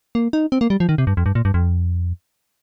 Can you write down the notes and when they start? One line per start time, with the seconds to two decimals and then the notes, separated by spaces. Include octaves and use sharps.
0.15 A#3
0.33 D#4
0.52 C4
0.61 A#3
0.70 G3
0.80 F3
0.89 D#3
0.98 C3
1.07 G2
1.17 F2
1.26 G2
1.35 A#2
1.45 G2
1.54 F2